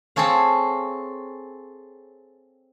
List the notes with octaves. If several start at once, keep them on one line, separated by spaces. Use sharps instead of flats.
C4 G#4 A4 C#5 F5